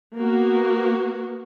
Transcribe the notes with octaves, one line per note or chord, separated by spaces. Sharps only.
A#3 B3 F#4